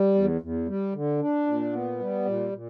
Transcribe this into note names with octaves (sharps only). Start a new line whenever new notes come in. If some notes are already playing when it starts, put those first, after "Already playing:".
Already playing: G3
E2
E2
G3
D3
D4
A#2
B3
G3
A#2
A#2